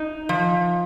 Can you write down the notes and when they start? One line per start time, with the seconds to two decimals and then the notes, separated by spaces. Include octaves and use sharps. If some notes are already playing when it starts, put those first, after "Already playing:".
Already playing: D#4
0.29 F3